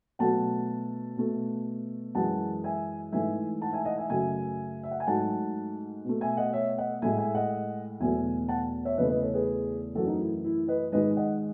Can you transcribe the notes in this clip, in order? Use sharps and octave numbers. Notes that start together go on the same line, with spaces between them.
B2 F#3 A3 F#5 A5
B2 A3
F#2 E3 G#3 F#5 A5
E5 G#5
G#2 E3 A3 E5 G#5
F#5 A5
E5 G#5
D#5 F#5
E5 G#5
F#2 C#3 F#3 A3 E5 G#5
E5
F#5
G#5
G#2 F#3 A3 F#5 A5
B2 A3
E5 G#5
D#5 F#5
C#5 E5
D#5 F#5
A2 G#3 E5 G#5
E5 G#5
D#5 F#5
E2 B2 F#3 A3 E5 G#5
F#5 A5
C#5 E5
E2 C#3 E3 A3 B4 D#5
B4 D#5
A4 C#5
G#4 B4
F#2 E3 A3 F#4 A4
D#4 F#4
E4
E4
B4 D#5
G#2 D#3 G#3 B4 D#5
D#5 F#5